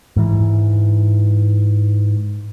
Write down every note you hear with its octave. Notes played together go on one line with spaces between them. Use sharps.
G#2 E3